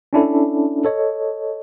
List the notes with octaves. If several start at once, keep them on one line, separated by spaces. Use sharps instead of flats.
C#4 D4 E4 A4
A4 C#5 D#5